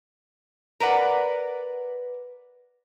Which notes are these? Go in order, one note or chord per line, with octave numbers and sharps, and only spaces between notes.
A#4 B4 D5 F#5